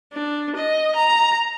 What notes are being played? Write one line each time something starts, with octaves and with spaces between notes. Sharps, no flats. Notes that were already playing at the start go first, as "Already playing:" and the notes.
D4
D#5
A#5